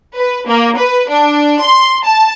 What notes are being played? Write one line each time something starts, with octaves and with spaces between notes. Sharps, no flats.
B4
A#3
B4
D4
C6
A5